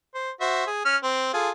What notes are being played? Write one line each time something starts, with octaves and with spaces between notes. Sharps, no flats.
C5
F#4 C5 E5
G#4
C#4 F6
C4
F4 G#4 A4